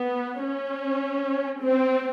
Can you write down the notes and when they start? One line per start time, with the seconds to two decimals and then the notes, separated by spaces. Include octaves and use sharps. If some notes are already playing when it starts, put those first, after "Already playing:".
Already playing: B3
0.44 C#4
1.62 C4